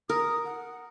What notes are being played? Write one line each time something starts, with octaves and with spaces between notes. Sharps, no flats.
A#4 D#6
F#5